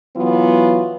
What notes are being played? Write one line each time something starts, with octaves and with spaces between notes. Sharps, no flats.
E3 F#3 B3 F4